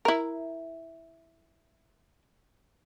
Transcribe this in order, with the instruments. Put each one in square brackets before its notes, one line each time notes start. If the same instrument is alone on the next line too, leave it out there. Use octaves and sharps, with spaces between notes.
[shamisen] E4 A#4